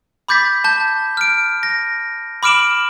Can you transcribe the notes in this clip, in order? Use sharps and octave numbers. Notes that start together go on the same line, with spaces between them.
B5 D6 G6 A6 B6
A5 G6
F6 D7
A#6
B5 D6 F6 D7 E7 F#7